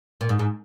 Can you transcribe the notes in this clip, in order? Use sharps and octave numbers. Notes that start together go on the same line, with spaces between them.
A#2
G#2
G#2